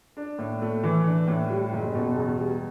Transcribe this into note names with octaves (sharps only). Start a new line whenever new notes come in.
D4
A2
A3
E3
D4
A2
G3
F#1
B2
E2
G3